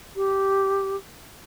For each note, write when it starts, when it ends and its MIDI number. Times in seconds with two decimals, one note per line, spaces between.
0.16 0.96 67